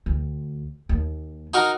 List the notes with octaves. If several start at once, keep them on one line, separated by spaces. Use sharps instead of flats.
D2
D#2
D#4 F#4 A#4